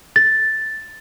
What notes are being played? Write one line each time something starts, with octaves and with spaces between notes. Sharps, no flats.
A6